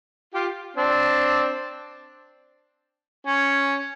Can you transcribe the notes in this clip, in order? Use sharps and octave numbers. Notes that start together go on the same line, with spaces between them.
F4 G4
C4 D4
C#4